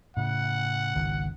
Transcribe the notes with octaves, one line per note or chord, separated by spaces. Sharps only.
A2 C#3 F#5
G#1 C#2 D#3